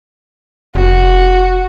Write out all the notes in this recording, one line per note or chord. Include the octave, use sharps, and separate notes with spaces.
F1 F#4